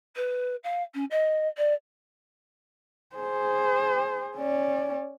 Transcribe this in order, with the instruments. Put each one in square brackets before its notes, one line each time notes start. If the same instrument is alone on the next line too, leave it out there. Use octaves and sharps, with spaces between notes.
[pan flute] B4
F5
C#4
D#5
D5
[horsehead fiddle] G#4 C5
C#4 D5